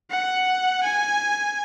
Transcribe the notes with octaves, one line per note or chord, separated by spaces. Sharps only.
F#5
G#5